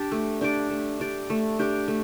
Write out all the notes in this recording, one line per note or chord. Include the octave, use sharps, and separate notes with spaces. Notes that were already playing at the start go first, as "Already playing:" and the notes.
Already playing: D4 G4 D5
A3
D4 G4 D5
A3
D4 G4 D5
A3
D4 G4 D5
A3